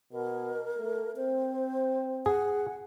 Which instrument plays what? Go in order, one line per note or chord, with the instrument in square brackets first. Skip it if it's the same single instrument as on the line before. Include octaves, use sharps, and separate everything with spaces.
[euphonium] B2 [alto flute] A#4
[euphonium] A3
[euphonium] C4 [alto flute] C5
[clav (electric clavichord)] G#4 [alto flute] F#5